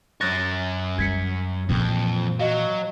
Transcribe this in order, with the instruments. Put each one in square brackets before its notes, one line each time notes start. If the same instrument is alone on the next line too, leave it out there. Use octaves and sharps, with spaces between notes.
[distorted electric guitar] F#2 C#5 [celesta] F#6 A6 A#6
[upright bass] G3 [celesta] G#6 B6 C#7
[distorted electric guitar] F2 [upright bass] A#2 E3
[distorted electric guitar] F#3 [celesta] D#5 F5